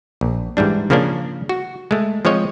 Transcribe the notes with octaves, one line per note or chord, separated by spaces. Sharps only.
A#1
G#2 E3 G3 D4
C#3 F3 A#3 C#4 D4
F#4
G#3 A3
F3 G#3 C4 C#5 D#5